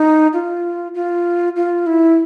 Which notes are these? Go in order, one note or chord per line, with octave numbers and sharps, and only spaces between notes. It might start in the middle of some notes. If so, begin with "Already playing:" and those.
Already playing: D#4
F4
F4
F4
E4